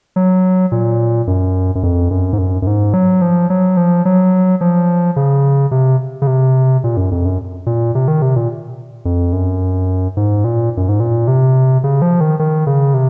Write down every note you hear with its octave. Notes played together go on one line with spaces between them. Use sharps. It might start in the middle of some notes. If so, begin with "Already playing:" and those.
F#3
A#2
F#2
F#2
F2
F#2
G#2
F#2
F#2
G#2
F#3
F3
F#3
F3
F#3
F3
C#3
C3
C#3
C3
A#2
F#2
F2
F#2
A#2
C3
D#3
C3
A#2
F2
F#2
G#2
A#2
F#2
G#2
A#2
C3
C#3
F3
D#3
D#3
C#3
C3